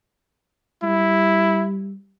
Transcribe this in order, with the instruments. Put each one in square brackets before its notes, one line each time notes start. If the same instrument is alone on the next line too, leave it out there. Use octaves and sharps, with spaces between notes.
[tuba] G3 [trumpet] E4